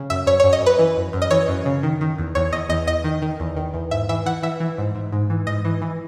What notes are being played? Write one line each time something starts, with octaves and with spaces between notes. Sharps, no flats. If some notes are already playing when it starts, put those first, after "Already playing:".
Already playing: C#3
F#2 E5
F#2 C#5
F#2 C#5
D#5
F#2
B4
E3
F#2
F#2
D#5
E3 C#5
F#2
C#3
D#3
D#3
E2
E2 C#5
E2 D#5
E2 D#5
E2 D#5
D#3
D#3
E2
D#3
E2
G#2 E5
E3 E5
E3 F#5
E3 E5
E3
G#2
G#2
G#2
E3
G#2 D#5
E3
E3